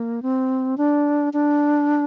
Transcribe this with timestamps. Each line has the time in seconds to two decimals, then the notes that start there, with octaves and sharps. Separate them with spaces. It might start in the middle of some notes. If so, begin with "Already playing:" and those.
Already playing: A#3
0.22 C4
0.78 D4
1.33 D4